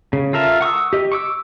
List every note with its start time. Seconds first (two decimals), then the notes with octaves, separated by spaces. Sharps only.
0.13 C#3
0.33 F4 A4 A#4 E5
0.61 F#5 C#6 D#6 E6
0.93 G4 D#5
1.12 C#6 D6 E6